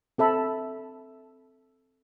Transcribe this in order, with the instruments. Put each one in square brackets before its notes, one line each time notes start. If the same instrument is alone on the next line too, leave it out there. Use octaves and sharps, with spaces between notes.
[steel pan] C4 A4 E5 B5